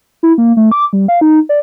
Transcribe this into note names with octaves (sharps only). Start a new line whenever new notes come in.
E4
A#3
A3
D6
G3
F5
D#4
D5